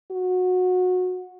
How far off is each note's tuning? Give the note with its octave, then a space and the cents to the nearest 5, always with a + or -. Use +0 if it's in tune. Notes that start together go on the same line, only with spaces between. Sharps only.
F#4 -20